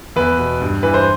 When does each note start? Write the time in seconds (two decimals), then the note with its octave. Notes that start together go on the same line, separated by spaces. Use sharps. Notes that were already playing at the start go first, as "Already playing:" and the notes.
0.16 E2 B4
0.39 B2
0.61 G2
0.83 E3 B4
0.94 C5